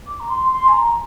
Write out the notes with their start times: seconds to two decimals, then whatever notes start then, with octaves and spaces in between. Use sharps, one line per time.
0.07 D6
0.20 A#5
0.29 C6
0.52 C6
0.68 G#5
0.73 A#5